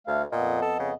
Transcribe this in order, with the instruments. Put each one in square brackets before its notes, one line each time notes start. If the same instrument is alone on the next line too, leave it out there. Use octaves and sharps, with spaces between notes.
[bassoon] D2 [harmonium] A3 F5
[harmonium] F2 B3 D#5 [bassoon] A#2
[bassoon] A4
C#3